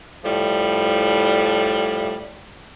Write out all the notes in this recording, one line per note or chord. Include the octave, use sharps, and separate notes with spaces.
A2 F3 G3